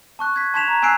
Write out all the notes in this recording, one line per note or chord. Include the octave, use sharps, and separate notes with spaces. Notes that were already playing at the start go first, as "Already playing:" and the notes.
A5 C#6 F#6
G#6 B6
A5 C6 G#6 B6 E7 F7
A#5
G#5 E6 F#6 C7 D7